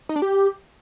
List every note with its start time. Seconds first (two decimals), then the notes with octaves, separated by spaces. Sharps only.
0.09 D#4
0.16 D4
0.22 G4